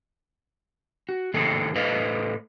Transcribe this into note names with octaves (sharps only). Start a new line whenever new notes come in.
F#4
A2 D#3 A#3 C4 G#4 A4
A2 A4 B4 C5 D#5 F5